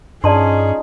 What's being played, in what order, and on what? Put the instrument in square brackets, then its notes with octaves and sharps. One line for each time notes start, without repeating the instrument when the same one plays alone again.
[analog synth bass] G2 [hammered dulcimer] F3 D#4 [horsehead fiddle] C#4 G#4 [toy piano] D5 A5 C6